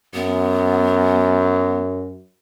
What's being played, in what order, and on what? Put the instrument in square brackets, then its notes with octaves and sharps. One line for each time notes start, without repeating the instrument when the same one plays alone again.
[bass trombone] F#2 [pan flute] B3